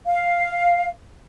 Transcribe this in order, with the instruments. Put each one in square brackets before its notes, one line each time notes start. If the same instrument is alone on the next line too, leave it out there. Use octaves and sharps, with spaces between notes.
[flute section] F5